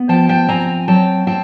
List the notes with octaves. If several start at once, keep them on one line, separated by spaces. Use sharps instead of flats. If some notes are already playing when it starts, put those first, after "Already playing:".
Already playing: B3
F3 G5 A5
G5 A5
C4 G#5 A#5
F#3 G5 A5
C4 G5 A5